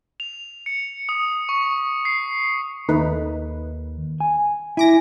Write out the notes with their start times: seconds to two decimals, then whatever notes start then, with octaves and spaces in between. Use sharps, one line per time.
0.20 F7
0.66 C#7
1.09 D#6
1.49 C#6
2.05 C7
2.89 D#2 A3 D#4 B4
4.20 G#5
4.77 E4 G#5 D6 A#6